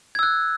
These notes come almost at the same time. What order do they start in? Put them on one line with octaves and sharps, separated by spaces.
G#6 E6 F#6